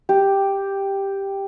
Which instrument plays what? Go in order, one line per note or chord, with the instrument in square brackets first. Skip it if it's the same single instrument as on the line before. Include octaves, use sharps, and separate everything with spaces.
[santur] G4